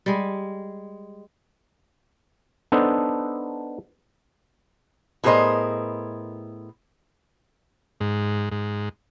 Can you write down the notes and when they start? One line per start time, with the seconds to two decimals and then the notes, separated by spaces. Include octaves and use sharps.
0.06 G3 G#3
2.72 B3 D4 D#4 A4 C5
5.24 A2 B3 G#4 A#4 C5 D#5
8.00 G#2
8.51 G#2